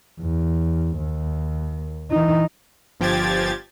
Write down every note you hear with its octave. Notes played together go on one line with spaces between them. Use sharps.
E2
D#2
E3 D#4
G1 F3 G4 G#6 A6